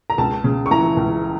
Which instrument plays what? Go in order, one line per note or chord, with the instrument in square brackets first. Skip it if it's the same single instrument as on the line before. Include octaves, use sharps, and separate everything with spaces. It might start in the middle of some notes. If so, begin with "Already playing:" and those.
[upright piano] A#5
C#2 A5
C#3
C#6
E3 A#5
C#2